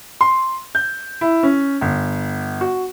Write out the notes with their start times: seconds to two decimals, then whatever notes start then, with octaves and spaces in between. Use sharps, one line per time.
0.21 C6
0.75 G6
1.21 E4
1.43 C#4
1.81 G1
2.61 F#4